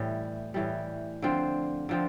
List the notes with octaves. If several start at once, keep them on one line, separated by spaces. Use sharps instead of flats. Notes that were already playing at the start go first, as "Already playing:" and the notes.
Already playing: A2 E3 G3
A2 E3 G3
D3 F3 C4
D3 F3 C4